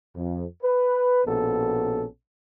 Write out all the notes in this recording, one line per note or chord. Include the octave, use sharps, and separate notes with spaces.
F2
B4
A#1 B2 B3 C#4 A4